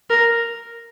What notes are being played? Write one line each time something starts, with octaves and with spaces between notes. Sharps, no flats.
A#4